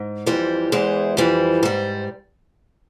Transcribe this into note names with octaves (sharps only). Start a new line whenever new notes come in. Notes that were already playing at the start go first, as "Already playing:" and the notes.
Already playing: G#2
F2 E3 G3 C5
E2 E3 G#3 C5
F2 E3 G3 C5
G#2 G3 C5